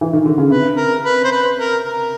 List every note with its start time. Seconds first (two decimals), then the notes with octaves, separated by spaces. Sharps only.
0.01 E3
0.13 D#3
0.26 D3
0.38 C#3
0.50 C3 B4
0.77 A#4
1.05 B4
1.24 C5
1.32 B4
1.59 A#4
1.86 A#4